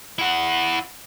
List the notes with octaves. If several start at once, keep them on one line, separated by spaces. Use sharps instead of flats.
E4 F#5